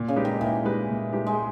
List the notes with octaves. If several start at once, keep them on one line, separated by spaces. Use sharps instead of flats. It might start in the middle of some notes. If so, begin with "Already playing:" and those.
Already playing: A#2
C#3
G#3 D#4 G4 B4
D#3
A#2 E3
G#3 D#4 G4 B4
A#2
G#3 D#4 G4 B4
G#3